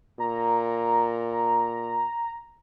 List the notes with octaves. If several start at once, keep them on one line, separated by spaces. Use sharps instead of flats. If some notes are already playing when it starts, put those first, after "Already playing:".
A#2 A#5